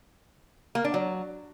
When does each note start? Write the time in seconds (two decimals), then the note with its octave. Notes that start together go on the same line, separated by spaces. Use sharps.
0.75 A#3
0.84 D4
0.94 F#3